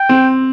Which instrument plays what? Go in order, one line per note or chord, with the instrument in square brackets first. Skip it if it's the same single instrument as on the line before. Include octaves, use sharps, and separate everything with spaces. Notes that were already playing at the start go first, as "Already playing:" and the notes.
Already playing: [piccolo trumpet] G5
[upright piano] C4